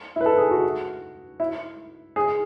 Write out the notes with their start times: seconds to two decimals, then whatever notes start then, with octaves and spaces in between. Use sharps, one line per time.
0.16 E4
0.21 B4
0.26 A4
0.38 G#4
0.51 F#4
1.40 E4
2.16 G#4